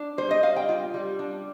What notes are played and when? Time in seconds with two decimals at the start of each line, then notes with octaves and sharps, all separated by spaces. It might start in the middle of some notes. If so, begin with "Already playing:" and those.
Already playing: D4
0.18 G3 C5
0.31 D#5
0.43 G3 F5
0.56 G5
0.69 F4
0.94 G3
1.19 D4